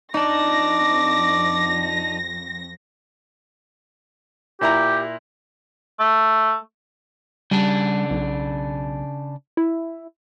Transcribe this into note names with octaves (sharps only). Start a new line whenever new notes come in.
F2 D4 D#4 D5 A#6
A#2 E4 G4 A#5
A3
C#3 G3 D4
B1
E4